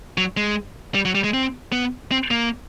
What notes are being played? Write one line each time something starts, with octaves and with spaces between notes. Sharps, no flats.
F#3
G#3
G3
F#3
G3
G#3
C4
B3
C4
A#3